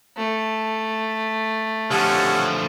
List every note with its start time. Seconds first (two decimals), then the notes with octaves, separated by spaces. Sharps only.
0.17 A3
1.91 D3 F3 C#4 G4 A4 F#5